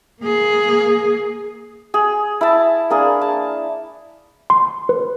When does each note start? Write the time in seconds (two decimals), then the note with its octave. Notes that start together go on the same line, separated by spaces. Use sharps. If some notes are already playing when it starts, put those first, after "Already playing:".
0.21 A#3 G#4
1.94 G#4
2.41 E4 A5
2.90 A#3 D4 G#4
3.21 A5
4.50 C6
4.89 B4